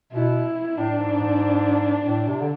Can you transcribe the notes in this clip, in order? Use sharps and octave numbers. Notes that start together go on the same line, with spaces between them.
B2 E4
A2 D4
G#2
G#2
A2
C3
D3